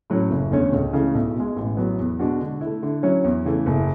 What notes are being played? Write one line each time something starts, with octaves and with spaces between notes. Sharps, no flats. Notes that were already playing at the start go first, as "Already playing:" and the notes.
A2 F#3 C#4
F#1
E2 D3 A3 C#4
C#2
C#3 E3 A3 E4
B1
B2 G#3
A1
A2 F#3 B3
E2
B2 G#3 D4 F#4
D3
E4
A3
D3
F#3 C#4 E4
E2
C#3 E3 A3
F#1